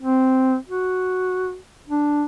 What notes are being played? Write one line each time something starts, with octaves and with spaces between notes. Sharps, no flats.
C4
F#4
D4